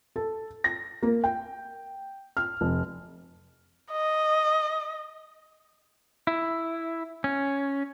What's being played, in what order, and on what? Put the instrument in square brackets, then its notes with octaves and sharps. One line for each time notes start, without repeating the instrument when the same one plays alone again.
[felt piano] A4
A#6
A#3
G5
F6
F1
[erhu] D#5
[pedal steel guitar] E4
C#4